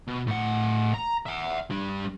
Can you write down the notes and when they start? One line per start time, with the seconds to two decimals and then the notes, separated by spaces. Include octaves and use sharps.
0.08 B2
0.27 A2 F#5
0.94 A#5
1.27 E5 F#5
1.71 G3 D4